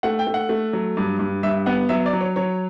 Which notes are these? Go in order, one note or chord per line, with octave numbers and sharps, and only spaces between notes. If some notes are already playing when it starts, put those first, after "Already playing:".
A3 F#5
G5
A3
F#5
A3
F#3
G2
G2
G2 E5
B3 F#5
F#3 E5
D5
F#3
C#5
F#3 C#5